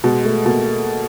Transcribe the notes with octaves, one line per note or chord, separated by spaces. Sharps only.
B2 G#3
A3
B2 A#3